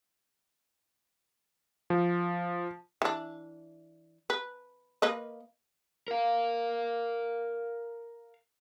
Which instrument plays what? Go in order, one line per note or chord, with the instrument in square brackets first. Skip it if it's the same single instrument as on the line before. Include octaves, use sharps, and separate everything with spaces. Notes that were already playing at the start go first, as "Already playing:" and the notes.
[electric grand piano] F3
[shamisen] E3 D4
B4
A#3 B4 D#5
[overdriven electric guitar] A#4 F5